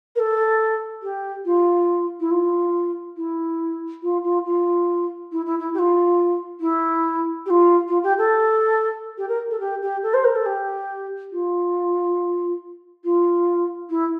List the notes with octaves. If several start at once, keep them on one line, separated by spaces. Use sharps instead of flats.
A#4
A4
G4
F4
E4
F4
E4
F4
F4
F4
E4
E4
E4
G4
F4
E4
G4
F4
F4
G4
A4
G4
A#4
A4
G4
G4
A4
C5
A#4
A4
G4
F4
F4
E4